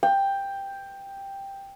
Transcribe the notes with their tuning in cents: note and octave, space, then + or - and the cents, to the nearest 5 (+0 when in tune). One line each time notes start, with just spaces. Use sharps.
G5 +5